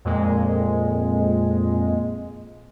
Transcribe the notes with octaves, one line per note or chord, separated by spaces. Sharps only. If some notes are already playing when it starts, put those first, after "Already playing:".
F2 A#2 G#3